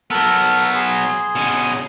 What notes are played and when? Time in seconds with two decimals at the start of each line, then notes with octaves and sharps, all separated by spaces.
0.11 F#3 B3 A4 A#4
0.75 G#4 C6
1.35 B2 C#4